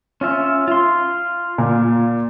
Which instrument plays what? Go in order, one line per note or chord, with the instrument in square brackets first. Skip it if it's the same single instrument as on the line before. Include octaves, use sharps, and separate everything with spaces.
[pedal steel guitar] C#4 F4 E5
F4 C6
[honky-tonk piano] A#2